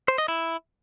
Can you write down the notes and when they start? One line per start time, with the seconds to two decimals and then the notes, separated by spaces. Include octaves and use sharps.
0.08 C5
0.18 D#5
0.28 E4